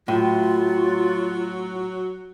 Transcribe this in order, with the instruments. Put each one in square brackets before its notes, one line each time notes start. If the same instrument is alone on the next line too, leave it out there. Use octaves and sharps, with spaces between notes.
[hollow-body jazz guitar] A2 [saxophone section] F#3 [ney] F4